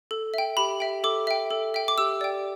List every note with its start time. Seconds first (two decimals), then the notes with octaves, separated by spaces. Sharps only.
0.11 A4
0.34 E5 G5
0.57 G4 B5
0.80 E5 G5
1.04 A4 D6
1.27 E5 G5
1.50 A4
1.74 E5 G5
1.88 D6
1.98 G4 E6
2.21 D5 G5